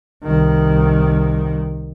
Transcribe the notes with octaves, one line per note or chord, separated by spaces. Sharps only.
C2 D#3